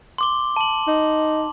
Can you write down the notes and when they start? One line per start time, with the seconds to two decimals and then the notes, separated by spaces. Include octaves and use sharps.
0.18 C6 D6 G7
0.56 A5 F#7
0.87 D#4